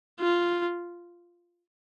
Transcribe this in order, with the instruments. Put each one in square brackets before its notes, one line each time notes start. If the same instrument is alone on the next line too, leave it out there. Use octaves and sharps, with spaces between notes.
[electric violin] F4